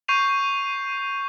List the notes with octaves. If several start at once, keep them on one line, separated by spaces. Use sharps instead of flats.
C#6 G6 C7 D#7 F7